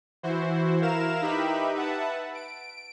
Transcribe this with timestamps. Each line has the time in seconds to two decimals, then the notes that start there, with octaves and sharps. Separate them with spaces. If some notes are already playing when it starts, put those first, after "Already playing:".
0.23 E3 E4 F#4 C5
0.82 E4 A#4 F5 A#5 E7
1.22 D#4 G4 B4 E5 B5
1.74 B4 E5 F#5 A5
2.35 D7